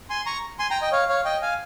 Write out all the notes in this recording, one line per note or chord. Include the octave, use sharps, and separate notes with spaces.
G#5 C6
A#5 C#6
G#5 C6
G5 A#5
D#5 G5
C#5 F5
C#5 F5
D#5 G5
F5 G#5